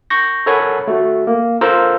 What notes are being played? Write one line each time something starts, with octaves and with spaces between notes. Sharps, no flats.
C#6 G6 A#6
A4 A#4 C#5 F#5 G#5 B5
A3 F#4
A#3
F4 A4 A#4 C5 A#5 E6